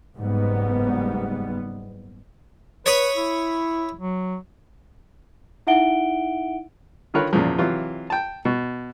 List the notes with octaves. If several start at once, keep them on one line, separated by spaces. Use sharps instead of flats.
F#1 G#2 G3 B3
B4 C#5 B5 D#6
E4
F#3
D#4 E4 E5 F#5 D7 G7
D3 D#3 F4 A#4 B4 C#5
E2 A#2 C#3 F3
C3 E3 F#3 F4
G5 A5
B2